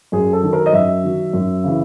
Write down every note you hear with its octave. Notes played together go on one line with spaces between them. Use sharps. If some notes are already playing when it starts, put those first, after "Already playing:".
F#2 G#4
A4
D#3 F#3
A#4
D#5
F#2 E5
D#3 F#3
F#2
C#3 E3